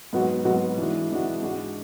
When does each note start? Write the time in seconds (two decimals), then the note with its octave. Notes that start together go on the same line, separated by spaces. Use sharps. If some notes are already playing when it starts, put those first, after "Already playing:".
0.13 G#2 F#3 B3 F#4
0.45 G#2 F#3 B3 F#4
0.78 E3 G#3 D4 F#4
1.10 E3 G#3 D4 F#4
1.42 G#2 G#3 D4 F#4